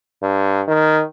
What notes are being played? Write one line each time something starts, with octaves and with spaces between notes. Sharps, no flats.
G2
D#3